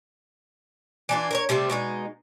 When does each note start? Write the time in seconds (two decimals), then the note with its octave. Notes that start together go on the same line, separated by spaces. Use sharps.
1.09 E3 D4 F4
1.31 A#4 C5 C#5
1.49 C3 G3 A3 C4
1.70 B2 G#3 D#4